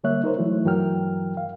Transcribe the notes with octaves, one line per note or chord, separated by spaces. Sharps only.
D3 G3 A#3 C#5 E5 F#6
D#4 A#4 C5 C#5
E3 F#3 A3 E4
G2 E3 F#3 A#4 G5 F6
F5